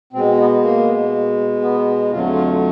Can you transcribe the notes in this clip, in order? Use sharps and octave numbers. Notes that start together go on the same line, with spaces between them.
B2 G#3 C4
B3
A#3
B3
F2 D3 F#3 A3 F4
F4